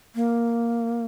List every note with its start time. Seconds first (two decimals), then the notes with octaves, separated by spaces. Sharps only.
0.15 A#3